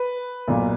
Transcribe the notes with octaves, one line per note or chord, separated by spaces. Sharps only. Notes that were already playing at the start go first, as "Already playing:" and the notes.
Already playing: B4
B1 A#2 A#3